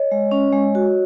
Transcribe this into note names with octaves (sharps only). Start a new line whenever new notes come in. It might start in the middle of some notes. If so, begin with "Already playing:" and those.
Already playing: C#5 D#5
G#3
C#4
G#3
F#4